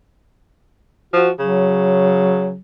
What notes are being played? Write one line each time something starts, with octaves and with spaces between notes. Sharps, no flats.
F3 F#4
C#3 F#3